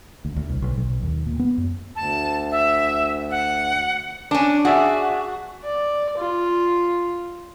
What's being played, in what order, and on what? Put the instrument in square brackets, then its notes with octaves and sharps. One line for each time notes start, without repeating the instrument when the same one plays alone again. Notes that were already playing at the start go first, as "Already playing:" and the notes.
[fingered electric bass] D2
D2
C2
B1
B1
D#2
A#2
B3
F#2
[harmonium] D2 [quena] A5
[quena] E5
F#5
[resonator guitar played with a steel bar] C#4 D4 [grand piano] A5
[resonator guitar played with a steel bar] F#4 [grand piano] G#4 D5 E5
[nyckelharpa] D5
F4